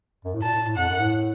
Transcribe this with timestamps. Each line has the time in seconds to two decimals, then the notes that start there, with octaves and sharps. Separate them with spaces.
0.25 F#2
0.34 A2
0.43 A#2 A5
0.54 A2
0.59 A#2
0.66 A2
0.76 F2 F#5
0.89 F#2
1.00 A2